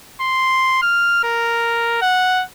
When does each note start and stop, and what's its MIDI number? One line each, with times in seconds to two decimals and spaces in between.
0.21 0.79 84
0.83 1.21 89
1.24 2.01 70
2.02 2.44 78